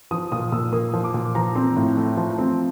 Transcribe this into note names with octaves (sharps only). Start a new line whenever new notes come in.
F3 D#6
A#2 D#6
A#2 E6
A#3 D#6
F3
D6
A#2
F3 A#5
C4
A2
A3
F3
C4